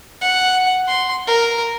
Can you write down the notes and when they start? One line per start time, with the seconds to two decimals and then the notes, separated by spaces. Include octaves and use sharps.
0.21 F#5
0.88 C6
1.27 A#4